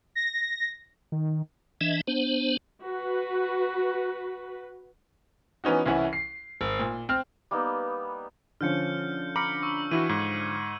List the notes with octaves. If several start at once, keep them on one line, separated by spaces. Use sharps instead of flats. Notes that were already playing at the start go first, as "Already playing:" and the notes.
A#6
D#3
E3 D4 D#5 E5
B3 D4 C5
F#4 B4
E3 B3 C#4 D#4 F#4
C2 E3 C#4 E4 F#5
C7
G#1
A#2
C4 F6
G3 A#3 B3 D#4
D3 F3 C#4 F6 G6 C#7
A#5 B5 D6 F6 C#7 F#7
C#6 E6 F6
E3 E4 F#4 D#7
G#2 G#6